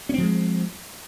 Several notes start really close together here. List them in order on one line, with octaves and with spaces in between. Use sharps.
C#4 C4 F3 G#3